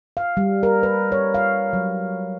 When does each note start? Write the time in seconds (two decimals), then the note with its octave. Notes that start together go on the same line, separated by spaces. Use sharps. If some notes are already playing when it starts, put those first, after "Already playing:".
0.17 F5
0.37 G3
0.63 A#4
0.83 B4
1.12 C#5
1.34 F5
1.73 F#3